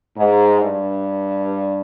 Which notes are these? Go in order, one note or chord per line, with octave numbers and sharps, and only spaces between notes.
G#2
G2